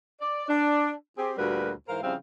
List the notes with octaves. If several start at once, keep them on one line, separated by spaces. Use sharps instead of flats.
D5
D4
C4 G4 G#4
D2 A#2 G3 F#4 A#4 B4
G#2 E3 A#4 C5 F5
C#3 F3 G3 C4 E4 F5